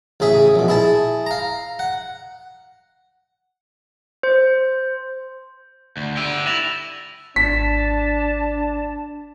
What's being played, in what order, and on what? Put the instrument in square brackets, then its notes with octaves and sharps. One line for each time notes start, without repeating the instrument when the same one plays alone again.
[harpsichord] A1 C#3 G#4 E5
A#1 B2
E4 G#4 A5
F5 A#5
F#5
[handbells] C5
[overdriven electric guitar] D2
[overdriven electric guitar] D3 G4 [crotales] E6 D#7
[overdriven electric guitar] E4 [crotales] A6 A#6 F7
[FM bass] G#1 [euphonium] D4 [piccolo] A5 [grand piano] B6